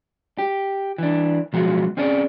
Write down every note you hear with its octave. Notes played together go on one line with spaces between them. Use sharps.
G4
E3 D4
B2 F3 F#3 G#3
C4 C#4 G#4 D5